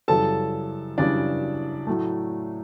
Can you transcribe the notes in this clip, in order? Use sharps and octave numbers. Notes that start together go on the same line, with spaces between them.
F#2 C#3 E3 G3 A4 A5
F#2 C#3 E3 G3 D4 D5
A2 F#3 A3